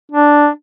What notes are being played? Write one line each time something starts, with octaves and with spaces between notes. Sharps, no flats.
D4